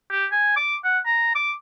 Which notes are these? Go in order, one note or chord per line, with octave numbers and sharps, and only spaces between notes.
G4
G#5
D6
F#5
A#5
D6